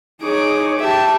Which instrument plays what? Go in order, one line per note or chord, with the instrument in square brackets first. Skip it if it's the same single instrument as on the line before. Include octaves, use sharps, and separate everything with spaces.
[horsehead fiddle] D#4 C#5 [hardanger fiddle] G#4 D6
[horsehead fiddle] G4 G5 [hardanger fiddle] E5 A5